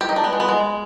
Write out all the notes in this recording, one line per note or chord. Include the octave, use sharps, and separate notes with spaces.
G4
D#4
D4
B3
G#3
B3
G#3